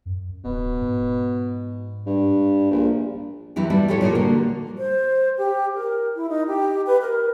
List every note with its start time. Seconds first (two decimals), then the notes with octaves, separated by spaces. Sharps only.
0.05 F#2
0.44 D1 B2
0.81 G#2
2.06 G2
2.71 A#1
3.56 E2 F#3 E4 G4
3.70 G3 B3 D4 E4
3.88 A2 F3 G3 G4 A4 C#5
4.01 A#2 F3 A#3 A#4
4.15 D3 G3 A#3 F#4
4.78 C5
5.38 G4
5.75 A#4
6.16 E4
6.29 D#4
6.48 G4
6.86 B4
7.02 A#4